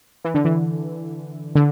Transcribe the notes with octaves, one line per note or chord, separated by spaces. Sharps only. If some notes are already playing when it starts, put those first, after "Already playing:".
E3
D3
E3
D3